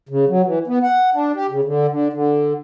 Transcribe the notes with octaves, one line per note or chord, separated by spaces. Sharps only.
C#3
F#3
E3
B3
F#5
D4
G4
C#3
D3
D3
D3